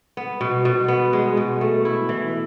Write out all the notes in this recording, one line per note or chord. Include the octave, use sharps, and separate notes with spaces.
B3
B2
B2
B3
G#3
B2
A3
E4
E3